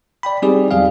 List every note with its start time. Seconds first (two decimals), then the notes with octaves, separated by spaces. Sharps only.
0.23 D5 G5 B5
0.42 G3 C4 D#4 G4 G#4 D5
0.71 E2 F#3 G3 G#4 F5